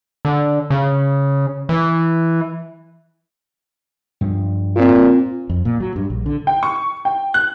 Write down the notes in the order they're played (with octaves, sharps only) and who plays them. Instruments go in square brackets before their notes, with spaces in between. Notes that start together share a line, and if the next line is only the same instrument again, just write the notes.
[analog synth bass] D3
C#3
E3
[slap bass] G2 F3
[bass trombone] A#2 [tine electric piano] C4 F4
[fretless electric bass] F2
A#2
F#3
G2
A#1
D3
[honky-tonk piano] G5
C#6
G5
F#6